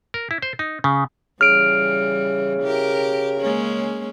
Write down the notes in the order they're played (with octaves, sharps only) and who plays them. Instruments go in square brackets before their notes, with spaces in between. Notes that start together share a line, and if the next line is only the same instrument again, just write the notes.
[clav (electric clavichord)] A#4
E4
C5
D#4
C#3
[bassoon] C#3 [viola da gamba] E3 G3 [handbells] F6 D7
[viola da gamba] G4 A#4
G#3 A#3 C#4